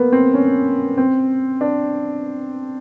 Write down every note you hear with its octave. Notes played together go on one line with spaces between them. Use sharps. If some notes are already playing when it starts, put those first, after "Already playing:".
Already playing: A#3 B3
C4
C#4
C4
D4